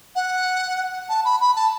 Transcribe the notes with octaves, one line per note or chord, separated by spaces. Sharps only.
F#5
A5
B5
B5
A5